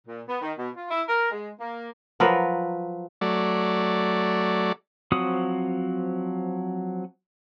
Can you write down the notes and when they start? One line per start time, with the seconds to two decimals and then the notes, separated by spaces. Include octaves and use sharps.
0.07 A#2
0.28 B3
0.41 D#3
0.58 B2
0.76 F4
0.91 E4
1.08 A#4
1.31 G#3
1.60 A#3
2.20 F3 F#3 A#4 B4
3.21 F#3 A3 D5
5.12 F3 F#3 C4 F#4 D#6